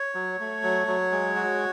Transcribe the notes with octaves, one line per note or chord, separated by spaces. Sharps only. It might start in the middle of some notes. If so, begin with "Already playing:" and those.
Already playing: C#5
F#3
A3
F#3
F#3
G#3
F#4